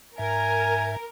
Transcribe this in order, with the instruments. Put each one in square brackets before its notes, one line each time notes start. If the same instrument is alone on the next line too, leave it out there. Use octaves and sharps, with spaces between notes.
[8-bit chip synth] G#2 E5 [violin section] A#4 [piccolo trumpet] G#5